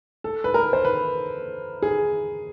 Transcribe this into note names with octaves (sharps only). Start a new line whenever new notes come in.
A4
B4
A#4
C5
B4
G#4